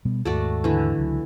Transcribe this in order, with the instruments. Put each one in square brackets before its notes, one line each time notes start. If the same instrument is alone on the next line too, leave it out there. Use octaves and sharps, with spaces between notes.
[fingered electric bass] B2 G3 B3
[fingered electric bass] D#2 G#2 [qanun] A3 F#4 D5
[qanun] D3 E3
[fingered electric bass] C#2 F#3